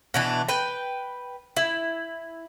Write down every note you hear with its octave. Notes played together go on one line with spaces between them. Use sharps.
B2 E3 D4
B4 G5
E4